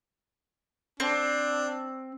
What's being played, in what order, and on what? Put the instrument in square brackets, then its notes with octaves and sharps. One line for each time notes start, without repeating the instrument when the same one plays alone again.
[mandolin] C4 [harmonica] D4